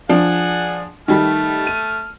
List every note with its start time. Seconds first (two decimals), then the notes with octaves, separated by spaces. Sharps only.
0.09 F3 D4 G#4 F#5
1.08 D#3 G3 A3 A5 F6
1.67 D#7